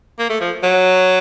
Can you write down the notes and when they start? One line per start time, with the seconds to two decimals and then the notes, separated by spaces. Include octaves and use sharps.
0.19 A#3
0.30 A3
0.41 F3
0.63 F#3